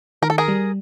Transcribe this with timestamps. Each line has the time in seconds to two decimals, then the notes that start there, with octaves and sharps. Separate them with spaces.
0.22 D#3 A#4
0.30 A4
0.38 G#4 A#4
0.48 G3